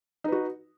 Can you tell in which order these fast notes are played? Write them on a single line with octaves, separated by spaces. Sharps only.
D#4 B4 F#4